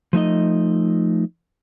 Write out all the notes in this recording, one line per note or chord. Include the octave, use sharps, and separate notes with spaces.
F3 A3 D#4 D#5